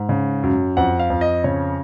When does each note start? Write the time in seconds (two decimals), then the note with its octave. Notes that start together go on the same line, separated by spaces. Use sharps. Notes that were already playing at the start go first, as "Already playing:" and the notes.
Already playing: G#2
0.09 C#3
0.43 F#2
0.77 F2 F#5
1.00 F5
1.10 F2
1.21 D#5
1.44 C#3 C#5